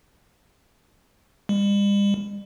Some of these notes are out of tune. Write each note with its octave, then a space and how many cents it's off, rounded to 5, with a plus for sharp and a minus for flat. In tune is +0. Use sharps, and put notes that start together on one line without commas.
G3 +45